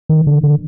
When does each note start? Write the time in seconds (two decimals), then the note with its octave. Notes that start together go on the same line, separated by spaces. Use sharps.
0.09 D#3
0.27 D3
0.43 D3